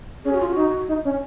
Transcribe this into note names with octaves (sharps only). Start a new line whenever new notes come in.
C#4 G#4
F#4
F4
F#4
D#4
D#4
C#4